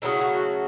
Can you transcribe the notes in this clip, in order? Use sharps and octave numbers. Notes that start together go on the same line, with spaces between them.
C#3 F#3 A3 E4
F#4